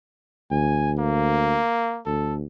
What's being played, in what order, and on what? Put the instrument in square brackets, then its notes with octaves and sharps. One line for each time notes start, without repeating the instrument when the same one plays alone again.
[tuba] D2 [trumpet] G#5
[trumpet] A#3
[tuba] D2 [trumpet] A4